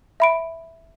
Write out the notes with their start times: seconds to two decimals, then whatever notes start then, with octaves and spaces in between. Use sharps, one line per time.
0.20 E5 B5 D7